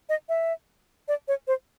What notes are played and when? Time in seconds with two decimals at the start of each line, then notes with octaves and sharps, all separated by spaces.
0.09 D#5
0.29 E5
1.08 D5
1.28 C#5
1.47 C5